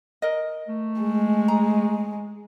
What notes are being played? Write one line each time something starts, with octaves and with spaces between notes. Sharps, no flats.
A#4 D#5
A3
G#3
A#5